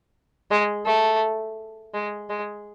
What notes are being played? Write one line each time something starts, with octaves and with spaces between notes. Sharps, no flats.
G#3
A3
G#3
G#3